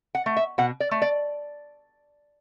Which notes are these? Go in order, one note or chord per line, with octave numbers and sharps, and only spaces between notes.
F#5
A3
E5
B2 F#5
D5
A3
D5